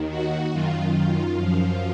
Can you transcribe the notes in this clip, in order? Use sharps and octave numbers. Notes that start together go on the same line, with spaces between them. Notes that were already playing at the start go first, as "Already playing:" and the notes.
Already playing: D#2 D#3
F#4
F#2 D#3 F4
F#2 F3